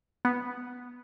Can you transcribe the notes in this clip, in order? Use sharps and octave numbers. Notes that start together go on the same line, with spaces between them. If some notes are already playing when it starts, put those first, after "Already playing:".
B3